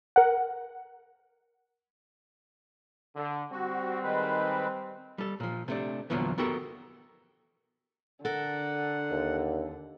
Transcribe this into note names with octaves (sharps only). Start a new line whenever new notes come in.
A#4 F#5
D3
G3 C4 F#4
D#3 G#3 B4
G3 A4
A#2 F3
C3 A3 D4
E2 A#2 D3 F3 F#3 B3
B3 F#4 G4 A4 A#4
D3 A4 A#4 F#5
D#2